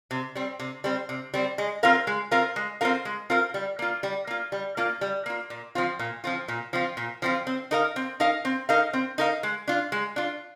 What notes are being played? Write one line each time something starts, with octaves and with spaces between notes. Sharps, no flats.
C3
G3 C4
C3
G3 C4
C3
G3 C4
G#3
C4 F4 A#4 F5
G#3
C4 F4 A#4 F5
G#3
C4 F4 A#4 F5
G#3
C4 F4 A#4 F5
G3
A#3 F4
G3
A#3 F4
G3
A#3 F4
G3
A#3 F4
A#2
F3 C4 F4
A#2
F3 C4 F4
A#2
F3 C4 F4
A#2
F3 C4 F4
C4
D#4 A#4 F5
C4
D#4 A#4 F5
C4
D#4 A#4 F5
C4
D#4 A#4 F5
G#3
D4 F4
G#3
D4 F4